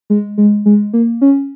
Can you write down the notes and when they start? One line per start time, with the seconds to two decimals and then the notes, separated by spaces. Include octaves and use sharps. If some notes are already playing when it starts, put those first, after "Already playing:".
0.10 G#3
0.38 G#3
0.66 G#3
0.93 A#3
1.21 C#4